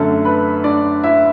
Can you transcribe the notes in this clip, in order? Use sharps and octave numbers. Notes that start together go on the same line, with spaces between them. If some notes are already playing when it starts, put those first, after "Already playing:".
Already playing: F#2 D3 A3 A4 A5
B4 B5
D4 D5
E4 E5